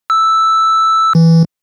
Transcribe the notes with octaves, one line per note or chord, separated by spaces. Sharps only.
E6
E3